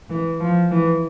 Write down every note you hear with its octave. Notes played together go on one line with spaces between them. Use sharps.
E3
F3
E3